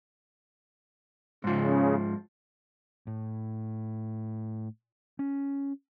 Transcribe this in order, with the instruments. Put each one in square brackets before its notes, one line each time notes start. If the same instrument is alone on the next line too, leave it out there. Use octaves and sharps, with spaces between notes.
[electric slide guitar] G#2 F3 [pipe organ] C#3
[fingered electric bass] A2
C#4